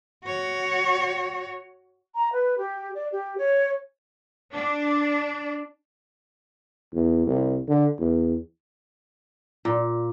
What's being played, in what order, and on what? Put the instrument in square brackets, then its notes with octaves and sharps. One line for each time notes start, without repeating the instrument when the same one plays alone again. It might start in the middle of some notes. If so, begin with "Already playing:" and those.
[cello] F#4 C#5
[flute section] A#5
B4
G4
D5
G4
C#5
[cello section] D4
[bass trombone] E2
C2
D3
E2
[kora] A#2